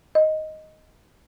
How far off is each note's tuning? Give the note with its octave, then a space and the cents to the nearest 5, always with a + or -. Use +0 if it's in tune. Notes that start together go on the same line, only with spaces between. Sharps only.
D#5 +5